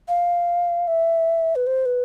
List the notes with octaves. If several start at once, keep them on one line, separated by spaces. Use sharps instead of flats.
F5
E5
B4
C5
B4